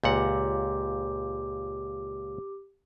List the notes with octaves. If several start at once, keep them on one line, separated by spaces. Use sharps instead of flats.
C#2 A#2 G4 F#5 D6